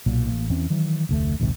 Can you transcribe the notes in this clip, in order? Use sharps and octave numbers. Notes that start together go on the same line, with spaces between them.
B1 A#2 F#3
A1 A#3
E2 E3 C4 C#4
D#3 E3 F#3
F1 D2 A3
A#1 D#2 G#2 C3